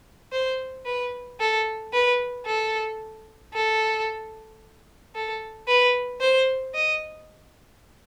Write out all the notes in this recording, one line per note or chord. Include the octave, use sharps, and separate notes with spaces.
C5
B4
A4
B4
A4
A4
A4
B4
C5
D#5